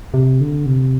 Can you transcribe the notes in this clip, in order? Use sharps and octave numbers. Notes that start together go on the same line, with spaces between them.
C3
D3
C3